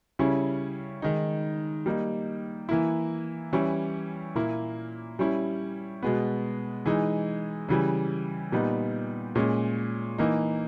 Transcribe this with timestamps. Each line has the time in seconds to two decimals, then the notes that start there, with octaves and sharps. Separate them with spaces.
0.19 C#3 G3 C#4 E4
1.02 D#3 G#3 D#4
1.86 G3 A#3 D#4
2.69 E3 A#3 E4
3.53 E3 G3 C#4 E4
4.35 A#2 A#3 E4
5.19 G3 C#4 E4
6.03 B2 G#3 B3
6.86 E3 G#3 D#4
7.69 C#3 E3 G3
8.52 A#2 G3 B3 D#4
9.35 A#2 G#3 C#4
10.18 E3 A#3 D#4